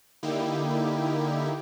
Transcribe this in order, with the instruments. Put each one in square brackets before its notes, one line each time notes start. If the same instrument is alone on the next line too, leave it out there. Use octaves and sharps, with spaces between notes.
[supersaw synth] D3 A#3 D#4 E4 G4